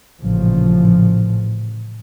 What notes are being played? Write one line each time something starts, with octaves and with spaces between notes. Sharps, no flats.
A1 A#2 C#3 F3